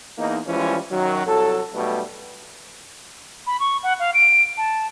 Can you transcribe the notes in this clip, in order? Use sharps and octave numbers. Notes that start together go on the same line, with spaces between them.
E2 A#3 D#4
E3 F3 G3 G#3 C#4
F#2 D#3 F#3
C2 F#3 A4
B1 B2 G3 A3 B3
B5
C#6
F#5
F5
D7
A5